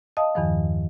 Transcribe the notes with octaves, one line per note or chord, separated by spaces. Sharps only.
D#5 F5 A5 D#6
E2 G2 D#3 F3